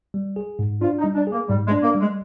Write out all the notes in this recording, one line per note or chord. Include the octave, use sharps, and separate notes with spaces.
G3
G#4
G#2
D4 F4
D#4
G3
D4
G#4
A#3
G#2 G3
G#3
D4
A#3
G3
G#3